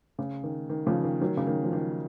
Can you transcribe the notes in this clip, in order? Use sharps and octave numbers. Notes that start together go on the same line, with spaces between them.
C#3
D#3
D#3
C#3 F3
D#3
D#3 F#3
C#3
D#3
F3
D#3